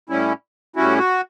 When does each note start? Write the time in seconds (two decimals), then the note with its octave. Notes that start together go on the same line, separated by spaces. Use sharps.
0.09 A2 G3 C#4 E4
0.76 A2 G3 C#4 E4 F#4
0.98 F#4